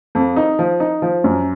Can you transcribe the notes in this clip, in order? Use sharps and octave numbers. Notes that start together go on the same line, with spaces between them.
F2
D#4
F3
D#4
F3
F#2